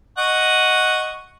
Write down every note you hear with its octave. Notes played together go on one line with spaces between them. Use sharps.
D#5 F#5 C#6